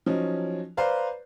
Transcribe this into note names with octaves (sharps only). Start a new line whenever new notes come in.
F3 F#3 C#4 D#4
B4 C5 D5 F5 A#5